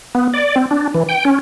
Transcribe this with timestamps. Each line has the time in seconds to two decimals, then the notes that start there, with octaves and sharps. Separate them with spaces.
0.15 B3
0.34 D5
0.56 C4
0.71 D4
0.94 E3
1.09 G5
1.25 C#4